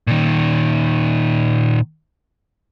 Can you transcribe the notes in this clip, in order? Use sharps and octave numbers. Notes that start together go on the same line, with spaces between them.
A#2 D#3